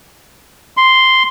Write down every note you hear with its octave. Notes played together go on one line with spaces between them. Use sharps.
C6